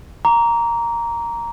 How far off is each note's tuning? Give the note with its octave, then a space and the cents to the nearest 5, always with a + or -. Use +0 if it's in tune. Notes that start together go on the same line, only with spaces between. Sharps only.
A#5 +0 D6 -35